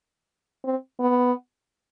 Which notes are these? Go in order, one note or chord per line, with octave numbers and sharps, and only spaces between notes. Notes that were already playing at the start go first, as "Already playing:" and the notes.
C4
B3